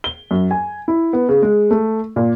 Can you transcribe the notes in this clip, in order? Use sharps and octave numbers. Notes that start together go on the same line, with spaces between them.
G7
F#2
G#5
E4
B3
C#3
G#3
A3
A#2